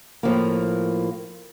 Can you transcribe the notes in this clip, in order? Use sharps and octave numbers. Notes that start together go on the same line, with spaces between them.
A2 F3 A#3